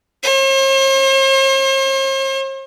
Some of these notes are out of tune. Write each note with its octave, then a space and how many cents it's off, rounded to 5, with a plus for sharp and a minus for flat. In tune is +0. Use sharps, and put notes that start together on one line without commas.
C5 +45